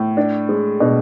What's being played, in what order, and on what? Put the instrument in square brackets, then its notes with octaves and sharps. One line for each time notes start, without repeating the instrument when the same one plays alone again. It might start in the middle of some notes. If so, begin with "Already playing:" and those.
Already playing: [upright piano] A2
D4
G#3
[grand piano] B2 [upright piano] D4